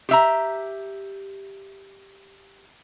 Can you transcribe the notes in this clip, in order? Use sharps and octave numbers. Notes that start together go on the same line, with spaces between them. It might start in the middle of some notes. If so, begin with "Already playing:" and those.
G4 E5 A#5